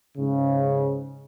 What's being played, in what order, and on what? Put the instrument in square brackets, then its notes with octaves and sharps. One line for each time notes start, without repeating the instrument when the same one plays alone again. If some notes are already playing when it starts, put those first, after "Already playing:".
[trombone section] G#2 C#3